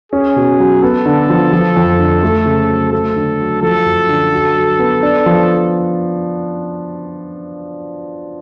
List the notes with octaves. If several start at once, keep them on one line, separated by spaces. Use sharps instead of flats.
C#4 G#4
B2
F#3
B3 A4
D3
F3
F3
F2
D3
A3
C#3
F#3
A3 A4
D3
F#3
F3 A4
F#2
D3
F#4
F#3
B3
D4
F3